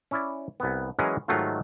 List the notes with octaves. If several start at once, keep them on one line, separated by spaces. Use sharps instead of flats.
C#4 E4 D5
C2 B3
E3 F#3 G#3 C#4 G#4 A#4
G#2 D#3 F#3 A3 F4